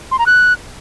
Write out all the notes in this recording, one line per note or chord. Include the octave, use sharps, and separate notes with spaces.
C6
A#5
F#6